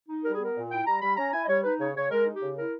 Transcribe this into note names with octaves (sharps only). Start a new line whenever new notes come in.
D#4
G3 A#4
G#4
B3 A#4
A#2
E4 G5
G3 A#5
G3 B5
C#4 A#5
E4 G#5
D#5
G3 C#5
D#4 B4
C#3 C#5
C#3 C#5
G#3 A#4
D#4
G4
C#3
E4 A#4